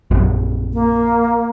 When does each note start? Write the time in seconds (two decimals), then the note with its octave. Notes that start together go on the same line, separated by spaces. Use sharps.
0.11 A#1 F#2
0.73 A#3